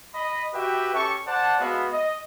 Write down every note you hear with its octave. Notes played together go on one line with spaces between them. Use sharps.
D#5 B5
F#4 G4 B4 E5 G5
C#4 G4 A4 C#6
C5 D5 F#5 A5
G#3 B3 F#4 E5 F5
D#5